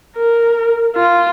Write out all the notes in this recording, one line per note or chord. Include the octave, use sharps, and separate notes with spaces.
A#4
F4